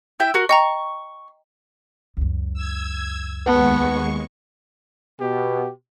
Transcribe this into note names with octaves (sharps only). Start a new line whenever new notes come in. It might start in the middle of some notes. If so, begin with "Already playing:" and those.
E4 E5 G5
F#4 A#4
D#5 G5 A#5 C#6
C#2 F#2
E6 G#6
D#2 G#3 B3 B4 F#5 A5 C#6
B2 B3 G4